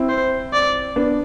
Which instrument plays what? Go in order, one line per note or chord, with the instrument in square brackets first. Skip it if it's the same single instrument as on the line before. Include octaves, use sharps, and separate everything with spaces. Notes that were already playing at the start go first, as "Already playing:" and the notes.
Already playing: [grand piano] C4 E4
[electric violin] C5
D5
[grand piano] B3 D4